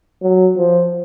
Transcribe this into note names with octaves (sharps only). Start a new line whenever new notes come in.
F#3
F3